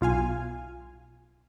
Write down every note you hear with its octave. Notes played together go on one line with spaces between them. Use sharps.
B1 F4 F5 G#5